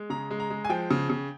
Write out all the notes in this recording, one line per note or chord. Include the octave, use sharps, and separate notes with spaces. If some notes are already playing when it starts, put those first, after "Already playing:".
Already playing: G#3
C#3 A#5
G#3
A#5
G#3
G#5
F3 G5
C#3
C#3